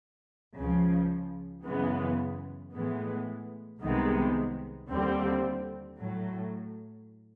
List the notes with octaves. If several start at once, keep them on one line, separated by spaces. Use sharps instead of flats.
C#2 C#3 F3
F#2 C#3 E3 G#3 B3
A2 E3 G#3 B3
C2 C3 D#3 G#3 B3
D#2 D3 G3 C4
A2 F#3 A3